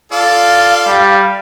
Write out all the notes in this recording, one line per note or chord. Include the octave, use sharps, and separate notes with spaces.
F4 A4 D5 F5
G3